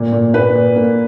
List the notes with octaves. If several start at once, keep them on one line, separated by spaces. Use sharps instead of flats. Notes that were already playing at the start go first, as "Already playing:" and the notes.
Already playing: A#2
A#2
A#2 B4
A#2
A#3